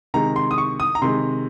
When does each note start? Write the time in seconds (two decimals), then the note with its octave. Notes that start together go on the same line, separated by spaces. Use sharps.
0.14 C3 D#3 G#3 A#5
0.36 C6
0.51 D#6
0.58 C#6
0.80 D#6
0.95 A#5
1.02 C3 D#3 G#3 C6